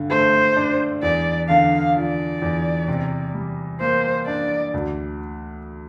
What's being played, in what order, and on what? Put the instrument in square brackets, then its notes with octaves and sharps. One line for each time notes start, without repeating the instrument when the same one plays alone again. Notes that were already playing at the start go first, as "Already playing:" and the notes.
Already playing: [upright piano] G2 D3
[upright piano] A3 [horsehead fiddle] C5
[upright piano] D4
[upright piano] E2 [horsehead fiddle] D5
[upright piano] D3 [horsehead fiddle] F5
[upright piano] F3 [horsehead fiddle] D5
[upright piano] E2
C3
G3
[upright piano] A#3 [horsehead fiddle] C5
[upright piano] D4 [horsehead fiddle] D5
[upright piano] D2